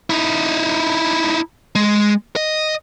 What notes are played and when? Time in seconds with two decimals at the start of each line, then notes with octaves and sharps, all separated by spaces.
0.10 D#4 E4
1.75 G#3
2.36 D#5